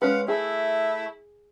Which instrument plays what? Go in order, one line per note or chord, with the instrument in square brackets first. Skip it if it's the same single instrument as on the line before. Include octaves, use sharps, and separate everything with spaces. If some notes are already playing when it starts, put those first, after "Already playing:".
[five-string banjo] G#3 C#4 B4 [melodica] F5 F#5
[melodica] A3 [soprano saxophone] E4 [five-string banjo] G#4